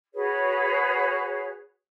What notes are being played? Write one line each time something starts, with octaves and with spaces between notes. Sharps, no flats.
F#4 G#4 B4 C#5